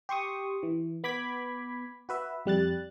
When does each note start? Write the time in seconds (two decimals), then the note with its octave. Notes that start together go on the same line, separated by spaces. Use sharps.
0.09 G4 C6 C#6 D#6
0.63 E3
1.04 B3 B5 D6 G#6 B6
2.09 F#4 B4 E5
2.46 F2 G3 F#6 A6